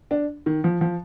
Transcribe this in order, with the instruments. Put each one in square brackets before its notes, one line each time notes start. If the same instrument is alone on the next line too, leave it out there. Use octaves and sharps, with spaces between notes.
[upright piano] D4
D#3
F3
F3